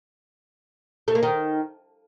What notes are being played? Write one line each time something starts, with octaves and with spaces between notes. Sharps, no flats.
A3
A#3
D#3